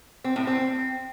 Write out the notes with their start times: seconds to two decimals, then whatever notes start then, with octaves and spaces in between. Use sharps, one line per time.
0.24 C4
0.36 A2
0.47 C4